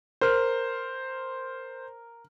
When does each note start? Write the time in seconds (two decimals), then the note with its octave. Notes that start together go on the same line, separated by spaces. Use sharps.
0.21 A#4 C5 F6